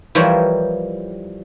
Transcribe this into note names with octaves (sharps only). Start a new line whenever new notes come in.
E3 F3 G3 F4 A#4 C#5